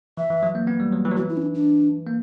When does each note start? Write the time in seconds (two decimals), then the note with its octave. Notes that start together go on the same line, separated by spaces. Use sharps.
0.17 E3 E5
0.30 E3
0.43 F#3
0.55 A#3
0.67 B3
0.80 G3
0.93 F#3
1.05 E3
1.11 F#3
1.17 E3 F#4
1.29 E4
1.37 C#4
1.42 D4
1.55 D4
2.07 A#3